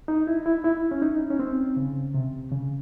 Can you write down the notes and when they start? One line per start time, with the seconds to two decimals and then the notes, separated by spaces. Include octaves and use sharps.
0.08 D#4
0.27 E4
0.46 E4
0.64 E4
0.91 C#4
1.02 D#4
1.30 C#4
1.39 C4
1.77 C#3
2.14 C3
2.52 C#3